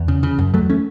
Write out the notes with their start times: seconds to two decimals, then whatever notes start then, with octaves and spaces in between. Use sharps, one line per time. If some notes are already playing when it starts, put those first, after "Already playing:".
Already playing: E2
0.08 C#3
0.23 C#3
0.38 F#2
0.54 E2 F#3 A3
0.70 A3 C#4